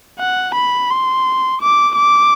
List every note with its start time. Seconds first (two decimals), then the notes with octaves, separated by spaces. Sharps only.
0.19 F#5
0.55 B5
0.90 C6
1.61 D6
1.96 D6